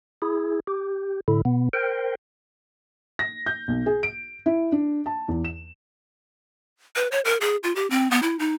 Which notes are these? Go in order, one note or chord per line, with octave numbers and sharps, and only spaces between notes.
E4 G#4
G4
A2 D3 E4
B2 B3
A#4 C5 G5
A#6
G6
B1
G#4
D7
E4
D4
A5
E2
E7
B4
C#5
A#4
G#4
F4
G4
C4
B3
E4
D#4